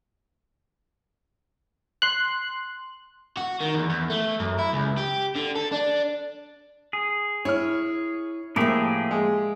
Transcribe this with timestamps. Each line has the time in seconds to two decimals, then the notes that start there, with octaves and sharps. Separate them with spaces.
2.02 C6 F#6
3.37 F#4
3.60 D#3
3.74 E2
3.90 E2
4.10 A3
4.40 F#2
4.59 E4
4.73 C#2
4.98 G4
5.36 D3
5.55 A4
5.72 D4
6.93 G#4
7.45 E4 C#5 F6
8.56 A2 F3 A#3 G4 G#4 E5
9.11 G#3